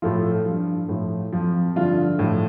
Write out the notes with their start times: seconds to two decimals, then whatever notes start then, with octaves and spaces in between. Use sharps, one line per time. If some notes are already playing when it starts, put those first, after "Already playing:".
0.02 A2 F3 F4 A4
0.46 G2 F3
0.89 A2 F3
1.32 F2 F3
1.76 G2 D3 F3 F4
2.19 A2 F3